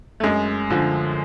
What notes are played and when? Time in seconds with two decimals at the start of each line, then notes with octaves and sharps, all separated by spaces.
0.20 A3
0.24 F#2 G#3
0.70 D3 F3